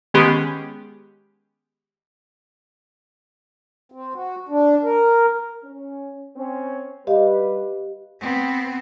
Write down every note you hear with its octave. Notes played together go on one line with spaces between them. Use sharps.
D#3 G#3 B3 C#4 G4 G#4
C4
F#4
D4
A#4
C#4
C4 C#4
G3 G4 B4 D#5 F5
B3 C4